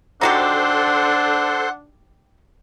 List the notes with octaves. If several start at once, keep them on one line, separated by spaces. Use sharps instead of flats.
D4 D#4 F#4 G4 A4 C5 F#5 C6